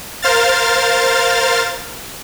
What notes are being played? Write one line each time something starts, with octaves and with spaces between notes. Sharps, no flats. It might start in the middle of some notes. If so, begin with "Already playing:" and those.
A#4 C5 F5 F6 A6